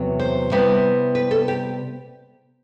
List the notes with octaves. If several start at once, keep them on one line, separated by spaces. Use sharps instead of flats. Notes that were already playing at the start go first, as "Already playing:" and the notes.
Already playing: E2 C3 F#3
C5
C3 G3 B3 E4
B4
A4
G4